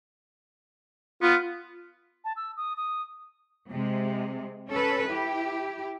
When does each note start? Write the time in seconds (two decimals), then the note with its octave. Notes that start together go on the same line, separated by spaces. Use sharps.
1.22 B3 F4
2.24 A5
2.36 E6
2.56 D#6
2.76 D#6
3.69 C3 G#3
4.71 C#4 A4 B4
5.10 E4 G4